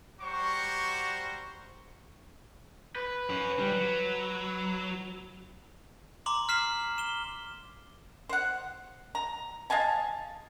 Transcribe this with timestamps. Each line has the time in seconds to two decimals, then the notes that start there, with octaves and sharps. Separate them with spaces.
0.21 G3 F#4 C5 A#5 C#6
2.96 B4
3.30 C#4 F#4
3.59 G3
3.72 F#3
6.26 A#5 C6 D6 F#7
6.49 F6 B6 C7 E7
6.98 E7 G7
8.29 C5 F#5
9.15 A#5
9.70 D#5 F5 G#5 A5